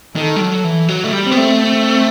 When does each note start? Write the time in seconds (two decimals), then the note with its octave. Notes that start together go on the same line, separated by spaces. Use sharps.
0.16 D#3 A4
0.36 G3
0.41 F#3
0.64 E3
0.89 F#3
1.04 A3
1.12 G3
1.24 C4
1.32 B3
1.37 A3
1.61 C4